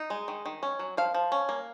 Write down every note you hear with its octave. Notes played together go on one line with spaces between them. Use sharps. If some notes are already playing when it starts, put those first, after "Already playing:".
Already playing: D#4
G#3
D#3
D#3
C#4
F#3
F3 F5
F3
C#4
A#3